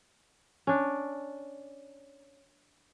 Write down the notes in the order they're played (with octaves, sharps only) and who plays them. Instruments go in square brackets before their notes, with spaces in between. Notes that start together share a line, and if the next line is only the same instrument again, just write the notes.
[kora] C#4 D4